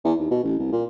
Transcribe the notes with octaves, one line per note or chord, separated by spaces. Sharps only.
E2
D#2
B2
A1
C2
A#2